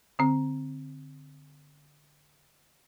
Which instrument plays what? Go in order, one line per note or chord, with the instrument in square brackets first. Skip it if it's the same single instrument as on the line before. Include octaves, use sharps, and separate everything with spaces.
[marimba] D3 C4